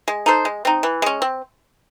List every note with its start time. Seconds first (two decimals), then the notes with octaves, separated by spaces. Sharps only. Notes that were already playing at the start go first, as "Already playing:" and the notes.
0.08 G#3
0.26 D#4 A4 C5
0.45 G#3
0.65 C4 D#4
0.83 E3
1.02 G#3 C#4
1.22 C4